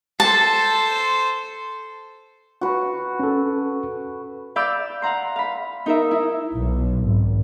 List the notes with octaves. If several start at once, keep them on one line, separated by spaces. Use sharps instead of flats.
A4 C5 A5
F#4 B4
C#4 A4
D5 F5 B5 D6 E6 G6
F5 F#5 A#5 C6
F5 B5
D#4 A#4 E5
E4
B1
G#1